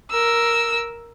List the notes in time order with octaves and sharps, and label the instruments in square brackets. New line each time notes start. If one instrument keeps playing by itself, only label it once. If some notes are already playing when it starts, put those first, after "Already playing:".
[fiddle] A#4 E6